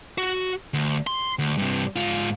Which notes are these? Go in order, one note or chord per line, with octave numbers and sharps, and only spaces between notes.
F#4
D2
C6
D2
G2 C3
G#2 F4